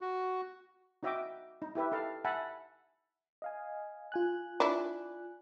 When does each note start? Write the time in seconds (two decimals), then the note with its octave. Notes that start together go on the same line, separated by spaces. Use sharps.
0.01 F#4
1.03 D#4 F#4 D#5 E5 G5 D6
1.62 D#4
1.75 E4 G4 B4 E5
1.92 D#4 A4 F5 A5
2.25 E5 F#5 G#5 A5 B5
3.42 D#5 F5 G#5
4.12 F4 G#5 F#6
4.60 D4 E4